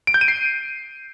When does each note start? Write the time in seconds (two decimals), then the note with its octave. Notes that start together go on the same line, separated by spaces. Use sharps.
0.07 D7
0.14 G6
0.21 D#7
0.28 C7